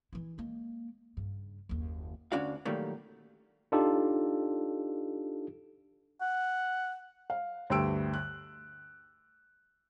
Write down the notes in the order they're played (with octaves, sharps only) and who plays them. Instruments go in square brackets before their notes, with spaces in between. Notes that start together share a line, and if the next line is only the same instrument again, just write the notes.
[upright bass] E3 E4
G#3 A#3
G2 C#3
F#1 D#2
[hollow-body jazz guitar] D2 C#4 D4 F#4 F5
A#2 D#3 F#3 G3 A3 A#3
[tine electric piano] D4 D#4 F4 G4 A4
[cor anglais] F#5
[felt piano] F5
D2 G2 G5 C6 E6 D7
F#6